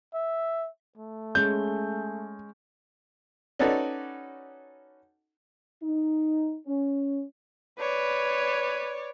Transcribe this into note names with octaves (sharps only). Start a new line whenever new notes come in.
E5
A3
G#3 C#4 G6
C#4 D#4 F#4 A4 B4 D5
D#4
C#4
B4 C#5 D5